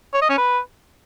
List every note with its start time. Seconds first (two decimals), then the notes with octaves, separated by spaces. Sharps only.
0.14 C#5
0.22 D#5
0.30 C#4
0.38 B4